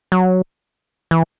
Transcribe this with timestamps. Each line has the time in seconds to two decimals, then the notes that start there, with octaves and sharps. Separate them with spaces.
0.12 F#3
1.11 E3